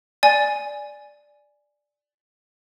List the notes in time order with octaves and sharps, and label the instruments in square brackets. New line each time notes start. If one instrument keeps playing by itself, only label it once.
[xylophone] D5 G#5